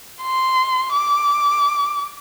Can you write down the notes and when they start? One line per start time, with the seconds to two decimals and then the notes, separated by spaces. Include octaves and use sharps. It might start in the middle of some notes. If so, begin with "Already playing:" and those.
0.22 C6
0.92 D6